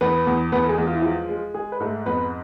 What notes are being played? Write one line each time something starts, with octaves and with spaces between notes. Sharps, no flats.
E2 B3 B4
E2
E2 B3 B4
A4
G#3 G#4
E2
F4
E4
F3 G#3 F4
G#3
G#3 G#4
B4
G#2 A3 A4
F2 B3 B4